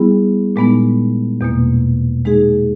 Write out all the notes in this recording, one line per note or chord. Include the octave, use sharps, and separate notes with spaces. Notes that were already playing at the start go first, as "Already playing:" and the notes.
Already playing: G3 B3 E4 G#4
A#2 G#3 B3 D#4
E2 B2 A#3
G#3 D#4 G#4